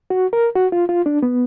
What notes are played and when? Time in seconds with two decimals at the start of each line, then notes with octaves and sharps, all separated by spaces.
0.10 F#4
0.33 A#4
0.55 F#4
0.72 F4
0.89 F4
1.06 D4
1.22 B3